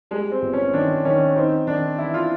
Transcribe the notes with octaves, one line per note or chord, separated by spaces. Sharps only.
G3 G#3
C4
G1
C#4
D#3 D4
D#3 C#4
C4 D#4
D#3 D4
E3 E4
F4